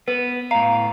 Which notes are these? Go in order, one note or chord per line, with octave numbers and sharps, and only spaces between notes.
B3 B4
A2 F5 A#5